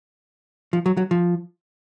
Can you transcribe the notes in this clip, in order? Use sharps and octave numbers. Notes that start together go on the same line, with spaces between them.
F3
F#3
F#3
F3